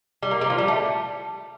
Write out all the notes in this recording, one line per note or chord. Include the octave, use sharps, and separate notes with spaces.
G3
A#3
G3
F3
G3
A3